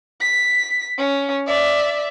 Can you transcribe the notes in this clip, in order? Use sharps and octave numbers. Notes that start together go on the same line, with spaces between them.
B6
C#4
D5 E5